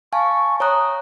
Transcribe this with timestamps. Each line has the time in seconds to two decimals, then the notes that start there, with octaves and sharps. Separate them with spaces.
0.13 F5 G#5 A5 C#6
0.60 C#5 A#5 D#6 F#6